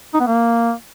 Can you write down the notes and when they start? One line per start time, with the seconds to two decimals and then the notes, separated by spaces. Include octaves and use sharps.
0.14 D#4
0.20 B3
0.27 A#3